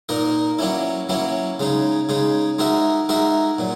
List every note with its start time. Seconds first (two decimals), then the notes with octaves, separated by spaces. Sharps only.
0.09 A#2 A#3 D#4 A#4
0.59 F#3 A#3 C#4 E4
1.09 F#3 A#3 C#4 E4
1.60 C#3 G#3 D#4
2.09 C#3 G#3 D#4
2.59 G#3 D#4 F#4 A#4 E5
3.09 G#3 D#4 F#4 A#4 E5
3.59 A#2 F#3